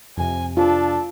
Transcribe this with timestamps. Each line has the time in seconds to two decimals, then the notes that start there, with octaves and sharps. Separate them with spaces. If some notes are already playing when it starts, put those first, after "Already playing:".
0.17 F2 C3 G#5
0.57 D4 F4 A4